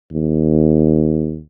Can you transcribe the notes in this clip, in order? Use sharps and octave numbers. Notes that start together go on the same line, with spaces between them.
D#2